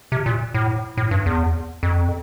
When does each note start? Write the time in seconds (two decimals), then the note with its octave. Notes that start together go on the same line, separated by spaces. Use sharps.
0.12 C3
0.26 A#2
0.54 A2
0.97 A2
1.11 G2
1.26 E2
1.83 F2